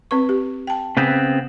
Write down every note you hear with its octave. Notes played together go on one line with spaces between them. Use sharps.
C4 B4 C#6
G4
G5 A5
C#3 B3 C4